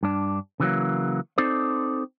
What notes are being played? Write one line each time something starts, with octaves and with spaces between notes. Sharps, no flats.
G2 D4
C#3 E3 F#3 A#3
C4 D#4 A4 C5 D5